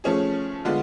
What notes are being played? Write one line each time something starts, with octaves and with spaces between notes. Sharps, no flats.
F3 A3 C#4 G#4
D3 G#3 B3 F4